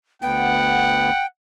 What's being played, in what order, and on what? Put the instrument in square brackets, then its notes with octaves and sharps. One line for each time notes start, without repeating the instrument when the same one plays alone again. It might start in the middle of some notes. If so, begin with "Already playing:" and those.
[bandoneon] D2 B3 [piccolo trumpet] F#5 [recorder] G5